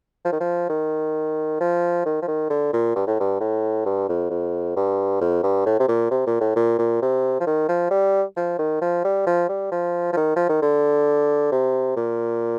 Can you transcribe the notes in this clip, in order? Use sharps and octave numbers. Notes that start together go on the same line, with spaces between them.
F3
D#3
F3
D#3
F3
D#3
F3
D#3
D3
A#2
G2
A2
G2
A2
G2
F2
F2
G2
F2
G2
A2
C3
A#2
C3
A#2
A2
A#2
A#2
C3
F3
D#3
F3
G3
F3
D#3
F3
G3
F3
G3
F3
F3
D#3
F3
D#3
D3
C3
A#2